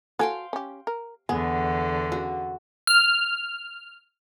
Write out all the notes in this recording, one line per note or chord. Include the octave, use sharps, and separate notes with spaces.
F#4 A4 F5 G5 G#5 C6
C#4 G4
A#4
E2 D3 B3 G#4
C#3 F#4
F6